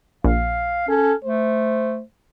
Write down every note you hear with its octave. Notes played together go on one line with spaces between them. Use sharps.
A#1 F5
C#4 A4
A3 C5